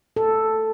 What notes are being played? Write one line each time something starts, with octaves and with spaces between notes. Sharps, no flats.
A4